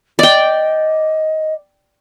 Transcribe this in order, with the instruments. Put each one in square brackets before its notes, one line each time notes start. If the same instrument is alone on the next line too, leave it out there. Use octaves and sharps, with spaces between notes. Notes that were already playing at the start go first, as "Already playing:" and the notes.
[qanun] D5 G5 [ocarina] D#5